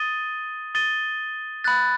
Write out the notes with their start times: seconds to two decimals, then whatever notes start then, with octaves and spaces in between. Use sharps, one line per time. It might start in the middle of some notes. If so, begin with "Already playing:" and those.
Already playing: D#6 A6 D#7 G7
0.75 D#6 A6 D#7 G7
1.64 B5 F#6 A6